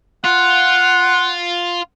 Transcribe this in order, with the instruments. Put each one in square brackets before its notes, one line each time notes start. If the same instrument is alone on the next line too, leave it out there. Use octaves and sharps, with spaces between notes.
[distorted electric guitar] F4 [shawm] F#5